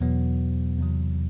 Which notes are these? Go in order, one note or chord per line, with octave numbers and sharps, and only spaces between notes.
E2 B2 F#3 B3
E2 C3 F#3